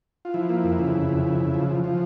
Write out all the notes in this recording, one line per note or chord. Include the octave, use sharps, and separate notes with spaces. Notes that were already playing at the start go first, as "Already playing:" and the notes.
F4
F3 E4
A#3
F2
C#3
C#3
F2
C#3
C#3
F3
F3
F3